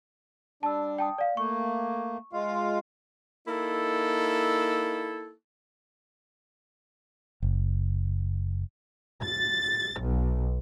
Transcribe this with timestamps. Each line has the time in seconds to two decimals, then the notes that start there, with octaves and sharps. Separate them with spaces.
0.63 G3 D4 A5 E6
0.98 G5 A5 D#6
1.18 D5 F5
1.37 A3 A#3 C#6
2.33 G#3 F4 F5
3.48 A#3 D#4 E4 A4
7.42 F#1
9.24 A6
10.01 B1